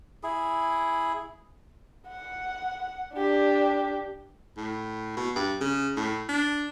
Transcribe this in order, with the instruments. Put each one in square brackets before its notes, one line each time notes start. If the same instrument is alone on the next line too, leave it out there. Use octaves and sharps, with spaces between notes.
[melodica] E4 G#4
[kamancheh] F#5
D4 G4
[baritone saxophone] A2
B2
G2
C#3
A2
D4